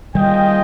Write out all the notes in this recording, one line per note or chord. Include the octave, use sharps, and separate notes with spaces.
D#3 G3 F4 G#4 D#5 G5